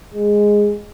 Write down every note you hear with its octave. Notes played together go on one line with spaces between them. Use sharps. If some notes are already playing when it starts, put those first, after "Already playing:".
G#3